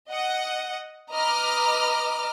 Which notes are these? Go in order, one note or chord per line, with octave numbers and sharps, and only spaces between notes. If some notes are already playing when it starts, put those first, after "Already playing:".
D#5 F#5
B4 D#5 A#5 D6 F6